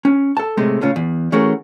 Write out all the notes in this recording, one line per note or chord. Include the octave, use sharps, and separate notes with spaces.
C#4
A4 A5
A2 C3 G#3 A3
A2 C#3 C#4 F4
E2
E3 A3 C#4 F#4 G#4 A#4